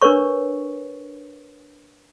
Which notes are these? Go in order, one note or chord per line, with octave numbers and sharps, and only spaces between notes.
D4 A#4 B4 C#5 C#6